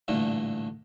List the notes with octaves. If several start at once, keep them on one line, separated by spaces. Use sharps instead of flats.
A1 G2 A#2 D3 A3